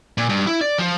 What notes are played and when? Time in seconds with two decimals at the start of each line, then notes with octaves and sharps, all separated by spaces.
0.18 A#2
0.29 G2
0.47 E4
0.61 D5
0.79 F3